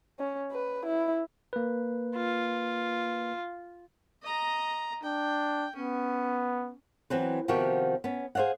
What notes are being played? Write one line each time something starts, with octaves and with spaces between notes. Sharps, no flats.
C#4
B4
E4
A#3 B4
F4
D#5 A#5
D4 G5
B3 C#4
E3 F#3 C4 B4
C3 D#3 F3 B3 F#4 G4
B3 C#4
G#4 C5 D5 F5 F#5